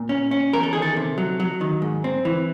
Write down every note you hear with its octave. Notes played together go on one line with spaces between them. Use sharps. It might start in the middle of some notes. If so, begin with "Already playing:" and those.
Already playing: A#2
C#4
C#4
E2 A#4
A4
D#3 G#4
A4
C3
F#3
F#3
D#3
G#2
C4
E3